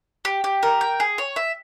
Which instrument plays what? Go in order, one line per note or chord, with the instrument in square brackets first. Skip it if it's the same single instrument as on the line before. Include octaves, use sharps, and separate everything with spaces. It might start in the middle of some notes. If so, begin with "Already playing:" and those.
[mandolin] G4
G4
A#4
G5
G#4
C#5
E5